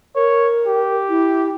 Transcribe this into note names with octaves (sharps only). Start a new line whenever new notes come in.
A#4 C#5
G4
E4